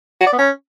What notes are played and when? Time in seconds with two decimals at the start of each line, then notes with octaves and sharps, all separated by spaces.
0.21 F#4
0.26 D5
0.32 B3
0.38 C#4